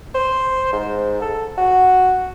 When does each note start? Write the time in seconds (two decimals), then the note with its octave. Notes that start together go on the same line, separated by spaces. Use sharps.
0.15 C5
0.73 G#2
1.22 A4
1.58 F#4